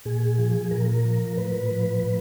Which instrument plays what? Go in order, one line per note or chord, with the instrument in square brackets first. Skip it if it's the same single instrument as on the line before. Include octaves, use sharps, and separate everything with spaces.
[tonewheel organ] A#2 G#4
F3
A#2 A#4
F3
A2 B4
F3
A2